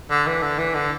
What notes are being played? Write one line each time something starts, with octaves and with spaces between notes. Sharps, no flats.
D3
E3
D3
E3
D3